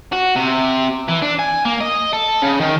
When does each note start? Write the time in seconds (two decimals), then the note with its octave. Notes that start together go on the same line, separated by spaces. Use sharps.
0.12 F#4
0.36 C3
1.08 E3
1.22 D4
1.39 G#5
1.65 A#3
1.81 D#5
2.13 A4
2.42 C#3
2.61 D#3